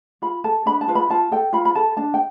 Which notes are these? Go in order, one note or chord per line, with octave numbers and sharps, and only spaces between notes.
F4 B5
A4 A5
D4 B5
A5
F4 B4
B5
F4 A5
A4 G5
F4 B5
B5
A4 A5
D4 A5
G5